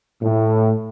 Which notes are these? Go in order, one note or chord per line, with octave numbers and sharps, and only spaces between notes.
A2